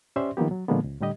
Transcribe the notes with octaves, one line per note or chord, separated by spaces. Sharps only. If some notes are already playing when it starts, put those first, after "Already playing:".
C#4 G4 C5 D5 E5 C6
D#3 F3 A#3 B3 G4
F#3
A#2 D3 F3 G#3 A#3 B3
C#2
A2 D3 G3 G4 D#5